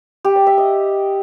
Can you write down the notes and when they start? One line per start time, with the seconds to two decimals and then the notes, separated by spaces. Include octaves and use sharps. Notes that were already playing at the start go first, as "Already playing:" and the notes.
0.25 G4
0.36 D5
0.47 E5
0.58 D#5